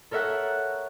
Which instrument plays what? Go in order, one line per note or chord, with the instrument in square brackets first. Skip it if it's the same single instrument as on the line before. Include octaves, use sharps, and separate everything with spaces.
[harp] A4 A#4 C#5 E5 F#5